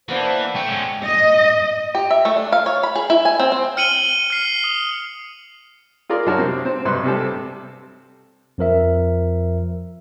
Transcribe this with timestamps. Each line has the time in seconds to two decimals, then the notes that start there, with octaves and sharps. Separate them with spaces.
0.09 E3 A#3 B3 D4 C5
0.55 A3 G5
0.68 G#2 C#4
1.05 D#5
1.95 G4
2.11 E5
2.25 A3
2.36 D4
2.52 F5
2.66 C#5
2.83 B5
2.95 G#4
3.10 E4
3.25 G#5
3.39 C4
3.52 C4
3.77 F6 C#7 D#7 F#7 G7
4.30 F6 C7
4.64 D#6
6.09 F4 G#4 A#4 D5
6.26 F#2 D4 F#4 A#4 C#5 A5
6.38 C3 C4
6.65 C4 C5
6.85 B1 G2 C3 B4 C6
7.04 C3 G3 C4 A4
8.58 F2 F3 A#4 E5